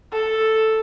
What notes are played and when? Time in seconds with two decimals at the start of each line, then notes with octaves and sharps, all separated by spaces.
0.12 A4